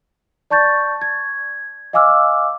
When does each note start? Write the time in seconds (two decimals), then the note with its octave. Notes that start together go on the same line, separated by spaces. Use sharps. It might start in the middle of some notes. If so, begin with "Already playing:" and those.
0.50 D5 A5 C#6 G6 A6
1.02 G#6
1.93 D#5 F5 G#5 D6 E6 F6